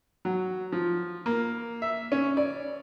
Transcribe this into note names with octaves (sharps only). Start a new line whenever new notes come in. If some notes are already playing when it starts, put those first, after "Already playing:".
F#3
F3
A#3
E5
C#4
D5